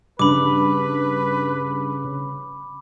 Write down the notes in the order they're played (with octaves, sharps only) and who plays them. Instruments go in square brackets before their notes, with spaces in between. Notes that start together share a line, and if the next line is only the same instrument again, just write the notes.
[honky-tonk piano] G2 [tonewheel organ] C#3 [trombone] B4 [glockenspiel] B5 D6